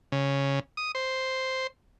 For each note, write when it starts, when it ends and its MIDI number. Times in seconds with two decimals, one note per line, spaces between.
0.12 0.59 49
0.77 0.92 87
0.95 1.67 72